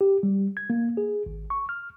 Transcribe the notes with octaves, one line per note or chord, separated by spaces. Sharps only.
G4
G3
G#6
A#3
G#4
G#1
C#6
F6